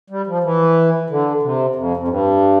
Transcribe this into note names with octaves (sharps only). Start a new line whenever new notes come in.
G3
F3
E3
D3
C3
F2
F2
G2